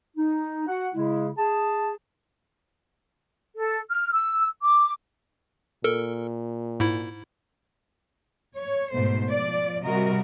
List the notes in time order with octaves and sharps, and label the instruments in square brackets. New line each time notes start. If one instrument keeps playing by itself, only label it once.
[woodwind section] D#4
F#4 F#5
C#3 G#3 E4
G#4 A5
[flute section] A4
F6
E6
D6
[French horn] A#2 [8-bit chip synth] A4 A#4
[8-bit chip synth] G#2 E4
[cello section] C#5
G#2 B2 A3 C5
F3 D5
C3 G3 F#4 A#4 D#5